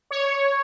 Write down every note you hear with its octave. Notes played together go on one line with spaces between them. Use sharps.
C#5